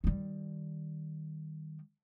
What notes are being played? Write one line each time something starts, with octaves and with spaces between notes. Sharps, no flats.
D#3 G3